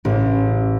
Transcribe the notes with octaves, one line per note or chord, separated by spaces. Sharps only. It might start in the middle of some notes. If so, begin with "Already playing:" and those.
A1